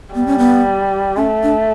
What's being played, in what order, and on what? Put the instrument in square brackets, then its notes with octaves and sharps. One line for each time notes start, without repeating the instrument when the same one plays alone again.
[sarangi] G3 [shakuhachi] B3
[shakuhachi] C#4
B3
[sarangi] A3 [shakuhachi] C#4
[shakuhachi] D4